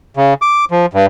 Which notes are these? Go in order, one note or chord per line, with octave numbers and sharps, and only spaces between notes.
C#3
D6
F3
G2